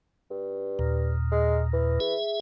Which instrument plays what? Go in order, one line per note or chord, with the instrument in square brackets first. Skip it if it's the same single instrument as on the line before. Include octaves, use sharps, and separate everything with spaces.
[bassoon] G2
[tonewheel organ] D#2 A#2
[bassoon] G#3
E3
[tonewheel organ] G#4 E5